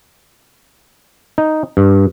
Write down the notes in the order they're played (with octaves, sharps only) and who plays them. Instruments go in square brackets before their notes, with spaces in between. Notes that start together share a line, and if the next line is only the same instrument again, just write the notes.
[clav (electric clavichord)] D#4
G2